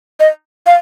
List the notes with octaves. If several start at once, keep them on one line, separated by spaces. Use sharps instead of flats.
D#5
F5